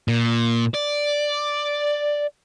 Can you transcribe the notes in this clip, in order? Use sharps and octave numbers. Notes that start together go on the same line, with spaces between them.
A#2
D5